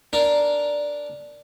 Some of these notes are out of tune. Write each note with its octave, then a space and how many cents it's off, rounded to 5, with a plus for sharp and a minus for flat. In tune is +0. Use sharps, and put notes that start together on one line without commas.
D4 +0 A#4 +0